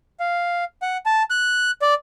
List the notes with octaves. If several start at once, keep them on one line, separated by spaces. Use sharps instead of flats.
F5
F#5
A5
F#6
D5